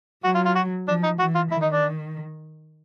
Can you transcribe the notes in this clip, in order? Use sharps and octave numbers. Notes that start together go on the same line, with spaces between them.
F#3 F#4
F4
F4
F#4
F3 D4
D#4
E3 F#4
F4
D#3 E4
D#4
D4